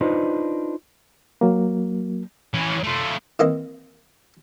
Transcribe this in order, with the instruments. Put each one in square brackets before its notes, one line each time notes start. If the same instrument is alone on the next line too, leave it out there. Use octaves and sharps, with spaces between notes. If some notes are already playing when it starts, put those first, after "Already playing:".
[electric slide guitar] D4 D#4 F4 B4 C5 D#5
[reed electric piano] F#3 A#3
[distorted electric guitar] E3 C#4
A3 F4
[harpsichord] D#3 E3 A#3 C4 D#5